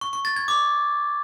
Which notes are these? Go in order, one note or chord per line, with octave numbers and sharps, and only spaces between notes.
C#6
C#6
A6
G#6
D6